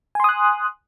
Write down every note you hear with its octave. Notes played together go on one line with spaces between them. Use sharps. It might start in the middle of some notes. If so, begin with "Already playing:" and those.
G#5 C6 D#6 F#6